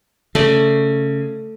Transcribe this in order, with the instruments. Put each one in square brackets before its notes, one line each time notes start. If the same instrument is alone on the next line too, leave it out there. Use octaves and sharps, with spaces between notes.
[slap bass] C#3 [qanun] A3 D5